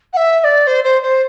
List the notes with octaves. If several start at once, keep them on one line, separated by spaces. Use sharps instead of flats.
F#5
E5
E5
D5
C5
C5
C5